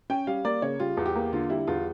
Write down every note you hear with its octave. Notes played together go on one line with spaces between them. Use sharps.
C#4 G5
G3 F5
A#3 D5
C#3 C#5
G3 F4
E2
G4
A#3
D3 F4
G3 E4
E2 F4